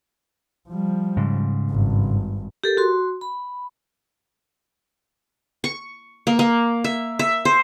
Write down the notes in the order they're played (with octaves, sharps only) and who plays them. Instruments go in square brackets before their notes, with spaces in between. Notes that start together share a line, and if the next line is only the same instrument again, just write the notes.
[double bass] F3 G3
[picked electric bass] G#2 C#3
[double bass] G#1 G2
[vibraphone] G4 A4 A#4
F#4 C6
B5
[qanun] C#6
A#3
A#3
E5
E5
C5